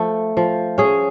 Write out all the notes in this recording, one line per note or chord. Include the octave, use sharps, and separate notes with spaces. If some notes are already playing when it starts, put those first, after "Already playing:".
Already playing: F3 A3
F3
C#4 G#4